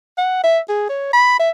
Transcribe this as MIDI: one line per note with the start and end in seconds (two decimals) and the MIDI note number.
0.18 0.42 78
0.44 0.59 76
0.69 0.88 68
0.90 1.10 73
1.13 1.36 83
1.39 1.50 76